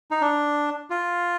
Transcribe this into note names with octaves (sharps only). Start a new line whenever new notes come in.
D#4
D4
F4